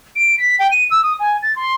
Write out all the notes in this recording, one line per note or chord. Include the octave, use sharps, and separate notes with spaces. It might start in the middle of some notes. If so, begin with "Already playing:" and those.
D7
B6
G5
D#7
E6
D#6
G#5
A6
C6